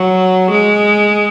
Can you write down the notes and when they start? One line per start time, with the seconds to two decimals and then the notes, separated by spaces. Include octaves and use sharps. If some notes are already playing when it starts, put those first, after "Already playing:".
Already playing: F#3
0.51 G#3